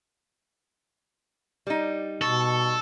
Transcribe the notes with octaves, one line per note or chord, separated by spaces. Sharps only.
G3 D#4
B2 A4 C#6